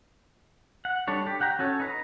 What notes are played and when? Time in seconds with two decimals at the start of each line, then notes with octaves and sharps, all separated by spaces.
0.85 F#5
1.08 G3 D4 A4 C#5
1.27 G4
1.40 G4 F#5 G5 A#5
1.59 C#4 F#4 A4 C#5
1.80 D#4 B4 A#5